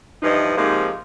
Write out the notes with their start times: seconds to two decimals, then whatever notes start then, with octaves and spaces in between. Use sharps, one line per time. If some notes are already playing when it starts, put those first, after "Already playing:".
0.23 G2 E3 F3 D#4 D#5
0.57 G#2 C3 F3 A#3 D#4